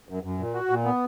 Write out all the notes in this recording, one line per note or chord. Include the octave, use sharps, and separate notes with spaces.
F#2
F#2
A#2
F#4
A#2
B3